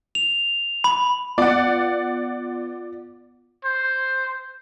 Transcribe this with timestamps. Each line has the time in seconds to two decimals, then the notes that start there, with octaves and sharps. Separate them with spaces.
0.15 F7
0.84 B5
1.38 B3 F4 D5 F#5
3.65 C5